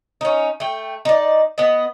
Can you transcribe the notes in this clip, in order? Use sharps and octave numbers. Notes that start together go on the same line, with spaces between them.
C#4 D#4
A3 G5
D#4 D5
B3 D#5